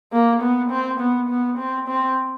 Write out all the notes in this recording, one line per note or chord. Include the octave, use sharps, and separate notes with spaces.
A#3
B3
C4
B3
B3
C4
C4